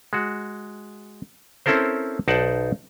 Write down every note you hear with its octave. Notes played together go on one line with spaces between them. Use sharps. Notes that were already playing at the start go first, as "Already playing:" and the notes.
G#3 F#4
C4 C#4 E4 A4 A#4 C5
B1 D#4 C5 D5 F#5 A5